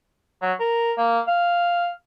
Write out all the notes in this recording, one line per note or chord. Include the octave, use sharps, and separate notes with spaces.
F#3
A#4
A#3
F5